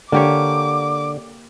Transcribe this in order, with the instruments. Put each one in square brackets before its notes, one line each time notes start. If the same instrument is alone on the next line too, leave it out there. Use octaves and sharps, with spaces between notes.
[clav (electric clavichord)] D3 [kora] A#3 G4 C#5 [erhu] D6